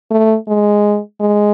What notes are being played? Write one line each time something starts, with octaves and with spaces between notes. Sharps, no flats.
A3
G#3
G#3